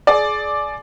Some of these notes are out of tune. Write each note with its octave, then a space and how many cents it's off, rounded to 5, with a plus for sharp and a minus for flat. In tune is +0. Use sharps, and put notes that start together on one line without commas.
G#4 +30 D5 +0